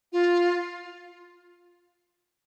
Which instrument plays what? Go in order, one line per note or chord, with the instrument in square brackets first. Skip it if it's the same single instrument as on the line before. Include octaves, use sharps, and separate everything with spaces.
[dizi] F4